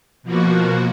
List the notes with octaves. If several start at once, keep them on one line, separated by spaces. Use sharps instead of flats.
B2 F3 A#3 F#4